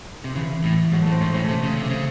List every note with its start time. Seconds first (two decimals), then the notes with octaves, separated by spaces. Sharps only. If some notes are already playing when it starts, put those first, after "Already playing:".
0.24 C3
0.35 C#3 E3
0.64 A2
0.92 G#2 F#3
1.02 A2 A3
1.12 C4
1.20 G#2 C#4
1.34 A2 C#4
1.44 C3 A3 C4
1.63 C#3
1.76 C3
1.90 C#3